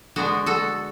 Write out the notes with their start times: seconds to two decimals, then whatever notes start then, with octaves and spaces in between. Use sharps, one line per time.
0.16 D3 G#3 B3 D4 F#4
0.46 F#4 A4